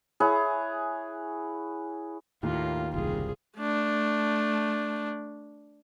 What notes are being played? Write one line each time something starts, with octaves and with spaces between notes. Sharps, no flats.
E4 G#4 C#5 F#5
D#2 A2 A#3 F4
F#1 C2 F4 G#4
A3 D4